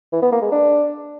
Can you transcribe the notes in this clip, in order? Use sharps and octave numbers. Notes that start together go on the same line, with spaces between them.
E3
B3
A#3
G#3
D4